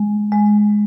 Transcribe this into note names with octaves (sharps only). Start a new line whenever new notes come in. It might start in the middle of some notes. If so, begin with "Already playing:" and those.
Already playing: G#3
G#3